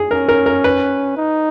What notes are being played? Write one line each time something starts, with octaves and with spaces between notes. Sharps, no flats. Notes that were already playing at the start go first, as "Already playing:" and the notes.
Already playing: G#4
C#4 A#4
A#4
A#4
B4
D#4